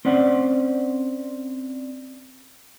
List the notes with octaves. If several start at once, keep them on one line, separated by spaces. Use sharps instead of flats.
C4 C#4 D5 F#5